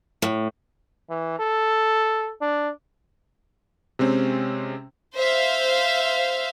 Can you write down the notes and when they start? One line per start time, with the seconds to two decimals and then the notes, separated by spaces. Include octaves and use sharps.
0.22 A2
1.09 E3
1.39 A4
2.41 D4
3.99 C3 G#3 C4 C#4
5.15 C5 E5 F5